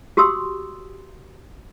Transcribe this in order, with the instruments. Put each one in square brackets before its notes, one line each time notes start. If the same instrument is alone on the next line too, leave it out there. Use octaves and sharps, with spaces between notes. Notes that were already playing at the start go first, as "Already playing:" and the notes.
[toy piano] F#4 G4 C6 D#6 E6